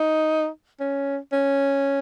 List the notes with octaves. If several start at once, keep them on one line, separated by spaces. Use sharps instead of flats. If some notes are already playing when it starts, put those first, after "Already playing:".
Already playing: D#4
C#4
C#4